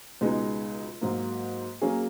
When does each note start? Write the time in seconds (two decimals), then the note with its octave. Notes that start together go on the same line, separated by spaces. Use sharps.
0.21 C#2 B2 G#3 B3 D#4
1.01 G#2 F#3 A#3
1.81 F#3 A#3 C#4 G#4